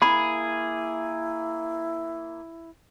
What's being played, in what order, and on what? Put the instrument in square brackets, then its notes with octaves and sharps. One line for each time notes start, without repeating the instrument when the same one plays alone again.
[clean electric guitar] A#3 G#4 [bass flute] E4 [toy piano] B5